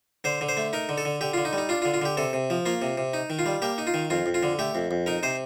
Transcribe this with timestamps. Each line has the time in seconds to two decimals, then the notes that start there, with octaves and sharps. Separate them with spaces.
0.24 D3 C5
0.41 D3
0.49 C5
0.57 A3
0.73 D#4 A#4
0.89 D3
0.98 A4
1.05 D3
1.21 D3 G4
1.34 F4
1.37 D3
1.45 D#4
1.53 G3
1.58 D#4
1.69 D4 F4
1.82 F4
1.85 D3
1.94 F4
2.02 D3 G4
2.17 C3 A4
2.33 C3
2.50 F3
2.66 A#3 F4
2.82 C3
2.98 C3
3.14 D#4
3.30 D#3
3.39 F4
3.46 G3
3.62 A#3 G4
3.78 D#4
3.87 F4
3.94 D#3
4.10 F2 F4
4.26 F2
4.34 F4
4.43 D3
4.59 A3 G4
4.75 F2
4.91 F2
5.06 D#4 A#4
5.23 C3 C5